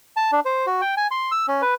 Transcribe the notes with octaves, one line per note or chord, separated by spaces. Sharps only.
A5
D4
C5
F#4
G5
G#5
C6
E6
C#4
B4